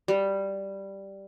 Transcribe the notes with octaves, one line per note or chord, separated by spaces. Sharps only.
G3